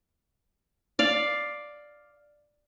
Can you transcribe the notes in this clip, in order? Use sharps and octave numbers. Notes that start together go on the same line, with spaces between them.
D5 F5